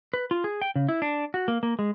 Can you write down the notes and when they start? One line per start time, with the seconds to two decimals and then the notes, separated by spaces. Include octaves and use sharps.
0.14 B4
0.31 F4
0.44 G#4
0.62 G5
0.76 C#3
0.89 E4
1.02 D4
1.34 F#4
1.48 A#3
1.63 A#3
1.79 G#3